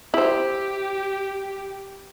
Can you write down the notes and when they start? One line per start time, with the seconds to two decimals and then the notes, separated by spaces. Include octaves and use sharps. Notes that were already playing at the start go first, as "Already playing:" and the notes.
0.14 E4 G4 C5